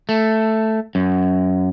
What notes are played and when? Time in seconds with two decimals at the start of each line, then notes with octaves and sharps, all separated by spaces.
0.09 A3
0.95 F#2